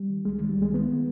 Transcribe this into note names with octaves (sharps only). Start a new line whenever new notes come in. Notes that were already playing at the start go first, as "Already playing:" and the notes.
Already playing: G3
D#3
C2 G#3
D#3
G3
C2 G#3
D#3 B3